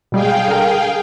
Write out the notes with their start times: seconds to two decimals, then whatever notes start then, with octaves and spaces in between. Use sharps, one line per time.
0.12 B2 G3 G#3 G#4 F5 G5
0.48 D3 A#4